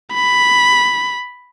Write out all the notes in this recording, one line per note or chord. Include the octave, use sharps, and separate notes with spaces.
B5